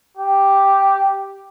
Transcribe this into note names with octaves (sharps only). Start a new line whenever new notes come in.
G4